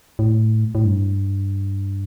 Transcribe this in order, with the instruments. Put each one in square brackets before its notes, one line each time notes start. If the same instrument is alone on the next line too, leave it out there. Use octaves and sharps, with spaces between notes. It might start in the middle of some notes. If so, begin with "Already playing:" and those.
[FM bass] A2
A2
G2